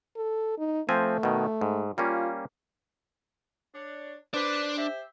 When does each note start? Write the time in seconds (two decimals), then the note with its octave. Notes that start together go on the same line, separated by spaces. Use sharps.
0.17 A4
0.58 D#4
0.89 F3 A3 C4 G#5
1.23 B2 D#3
1.61 G#2
1.98 G3 A#3 C#4 F4
3.74 D4 C#5
4.34 D4 B4 C5 D5
4.77 G4 C5 E5